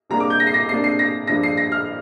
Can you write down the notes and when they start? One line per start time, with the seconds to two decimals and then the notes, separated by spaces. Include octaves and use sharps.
0.10 C3 G3 A#3 D4 A#5
0.20 D6
0.30 G6
0.40 A#6
0.47 C7
0.54 A#6
0.69 C3 A#3 D4 C7
0.84 C7
0.99 A#6
1.27 G2 F3 A#3 D4 A#6
1.43 C7
1.57 A#6
1.72 F6